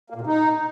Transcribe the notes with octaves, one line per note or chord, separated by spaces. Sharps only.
A#3
A#2
C3
D#4